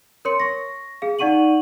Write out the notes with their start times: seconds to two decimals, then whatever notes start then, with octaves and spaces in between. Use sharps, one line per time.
0.25 A#4 C#5 C6 C#7
0.40 C#6 A#6
1.02 G#4 F5
1.19 D#4 D5 F#5 C#6 D#7 F#7